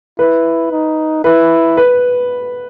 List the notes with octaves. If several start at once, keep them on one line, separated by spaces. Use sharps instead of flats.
E4 B4
D#4
E4 B4
B4